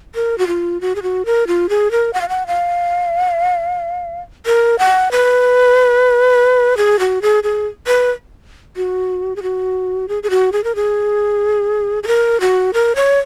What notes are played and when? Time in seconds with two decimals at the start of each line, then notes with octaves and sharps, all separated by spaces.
0.15 A#4
0.38 F#4
0.47 F4
0.81 F#4
0.95 G#4
1.03 F#4
1.26 A#4
1.47 F4
1.69 G#4
1.91 A#4
2.13 F#5
2.21 F5
2.29 F#5
2.47 F5
4.46 A#4
4.79 F#5
5.12 B4
6.77 G#4
6.99 F#4
7.22 G#4
7.43 G#4
7.87 B4
8.76 F#4
9.36 G#4
9.42 F#4
10.08 G#4
10.23 G#4
10.30 F#4
10.52 G#4
10.64 A#4
10.75 G#4
12.03 G#4
12.07 A#4
12.40 F#4
12.74 A#4
12.96 C#5